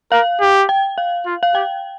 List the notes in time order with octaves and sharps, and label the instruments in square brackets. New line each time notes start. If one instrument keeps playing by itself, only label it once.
[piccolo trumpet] A#4 [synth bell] F5
[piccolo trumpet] G4
[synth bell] G5
F5
[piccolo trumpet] F4
[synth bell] F5
[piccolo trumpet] G4 [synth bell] G5